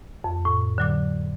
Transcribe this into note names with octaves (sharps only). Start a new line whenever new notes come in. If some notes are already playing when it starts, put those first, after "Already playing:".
F2
A2
D3 F#3 D6